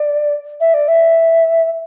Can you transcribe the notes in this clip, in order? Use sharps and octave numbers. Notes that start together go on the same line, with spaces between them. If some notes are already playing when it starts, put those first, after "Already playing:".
Already playing: D5
E5
D5
E5